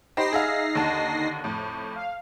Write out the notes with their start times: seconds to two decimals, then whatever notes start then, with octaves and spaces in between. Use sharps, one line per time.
0.17 D#4 G4 C5 B5 A#6 C7
0.33 G#4 E5 F5
0.75 D#2 D3 A5
1.44 F2 A2
1.96 F5